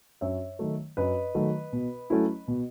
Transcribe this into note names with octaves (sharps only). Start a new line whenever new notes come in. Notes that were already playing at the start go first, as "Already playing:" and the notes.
F#2 C#5 E5
D#3 F#3 A3
F#2 B4 D#5
D#3 F#3 A3
B2
F#3 A3 C#4 E4
B2